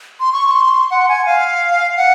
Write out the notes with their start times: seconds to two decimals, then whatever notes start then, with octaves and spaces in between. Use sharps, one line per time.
0.20 C6
0.33 C#6
0.47 C#6
0.51 C6
0.91 F#5
1.09 G#5
1.26 F5
1.97 F#5